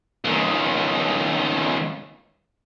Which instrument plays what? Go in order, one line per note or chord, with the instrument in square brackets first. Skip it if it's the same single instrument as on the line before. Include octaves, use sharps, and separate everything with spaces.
[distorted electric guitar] C#2 D#3